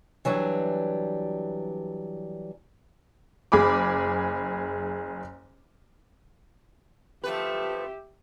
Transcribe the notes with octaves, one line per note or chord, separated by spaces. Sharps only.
E3 F#3 G3 D4
F#1 G#4 B5 D6
F3 A3 G4 B4 E5